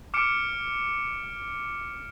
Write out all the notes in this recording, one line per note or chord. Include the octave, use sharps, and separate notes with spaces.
D6 F6 C#7 D7